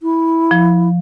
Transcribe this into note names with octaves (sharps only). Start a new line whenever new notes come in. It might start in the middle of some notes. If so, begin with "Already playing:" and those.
E4
F3